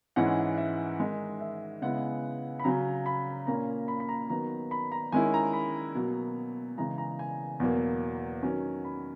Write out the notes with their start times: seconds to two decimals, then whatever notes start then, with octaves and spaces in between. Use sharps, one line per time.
0.16 G#2 E3 G#3 C#4 E4 F#5
0.58 E5
0.99 D#3 G#3 D#4
1.41 E5
1.82 C#3 G#3 B3 E4 F#5
2.59 B5
2.64 C#3 F#3 C#4 A#5
3.06 B5
3.47 A#2 A#3 C#4 A#5
3.88 B5
4.00 B5
4.09 A#5
4.30 D#3 F#3 B3 A#5
4.71 B5
4.92 A#5
5.12 D#3 G#3 C#4 E4 G#5
5.34 A#5
5.53 B5
5.95 B2 F#3 A#3
6.78 C#3 E3 G#3 A#5
6.98 A#5
7.19 G#5
7.60 E2 B2 F#3 A#3
8.43 D#3 F#3 C#4
8.85 B5